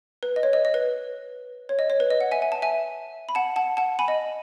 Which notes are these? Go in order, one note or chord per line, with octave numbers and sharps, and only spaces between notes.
B4
D#5
C#5
D#5
D#5
B4
C#5
D#5
C#5
B4
D#5
F#5
E5 G#5
G#5
A5
E5 G#5
B5
F#5 A5
F#5 A5
F#5 A5
G#5 B5
D#5